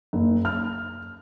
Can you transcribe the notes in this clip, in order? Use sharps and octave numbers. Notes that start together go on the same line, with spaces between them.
F#1
F6